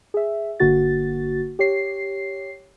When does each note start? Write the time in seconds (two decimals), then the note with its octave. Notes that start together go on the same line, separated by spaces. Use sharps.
0.14 G#4 E5
0.60 G1 D3 A#3 F#4 A6
1.59 G4 C#5 C7